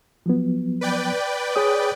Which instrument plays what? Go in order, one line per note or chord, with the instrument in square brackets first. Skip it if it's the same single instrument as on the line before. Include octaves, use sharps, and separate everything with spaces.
[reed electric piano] F3 F#3 B3
[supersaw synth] B4 D5 G5
[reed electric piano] G#4 C#5 D#6